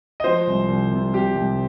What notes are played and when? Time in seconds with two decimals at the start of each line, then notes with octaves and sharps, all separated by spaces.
0.20 D#5
0.24 F3 C5
0.47 C2
0.68 C2
0.91 C3
1.14 C2 G4
1.35 C2